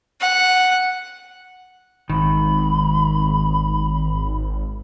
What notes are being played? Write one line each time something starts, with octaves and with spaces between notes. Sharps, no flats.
F#5
G#1 G#2 D#3 B5